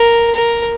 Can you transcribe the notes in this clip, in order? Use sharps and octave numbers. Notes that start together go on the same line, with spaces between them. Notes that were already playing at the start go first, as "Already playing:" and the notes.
Already playing: A#4
A#4